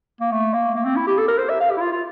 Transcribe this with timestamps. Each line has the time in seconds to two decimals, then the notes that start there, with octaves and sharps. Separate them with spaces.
0.20 A#3
0.32 A3
0.54 A#3
0.75 A#3
0.85 C4
0.96 E4
1.07 G4
1.18 A4
1.28 A#4
1.38 C5
1.49 E5
1.60 F5
1.70 G4
1.77 E4
1.81 F4
1.92 F4